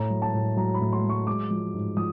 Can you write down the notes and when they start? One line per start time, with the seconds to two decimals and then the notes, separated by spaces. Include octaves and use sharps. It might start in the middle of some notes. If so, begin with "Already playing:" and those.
Already playing: A2 A#5
0.10 F#3
0.22 A5
0.34 A2
0.57 F#3 A#5
0.75 B5
0.81 A2
0.93 C6
1.04 F#3
1.09 C#6
1.27 G#3 D6
1.50 F3
1.74 G#2
1.97 F3 D#6